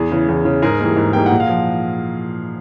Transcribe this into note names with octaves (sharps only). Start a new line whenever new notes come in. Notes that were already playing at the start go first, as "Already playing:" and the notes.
Already playing: E2 G#4
C#3 E3
E2 G#4
C#3 E3
G#2 G#4 A#4
E3 G3 A#3 D#4
G#2
E3 G3 A#3 D#4 G5
F#5
A#2
F5
F3